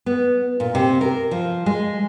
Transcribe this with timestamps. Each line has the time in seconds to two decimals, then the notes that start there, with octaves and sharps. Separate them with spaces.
0.06 B3
0.60 A#2
0.75 C3
1.01 A#4
1.31 F3
1.66 G#3